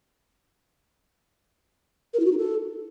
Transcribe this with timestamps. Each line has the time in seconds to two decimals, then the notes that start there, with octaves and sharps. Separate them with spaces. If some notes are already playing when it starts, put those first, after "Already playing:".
2.14 A#4
2.20 E4
2.26 F#4
2.32 D#4
2.38 A4